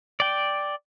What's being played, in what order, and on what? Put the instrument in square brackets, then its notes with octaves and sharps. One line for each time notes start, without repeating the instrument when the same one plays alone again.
[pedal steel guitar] D5 G5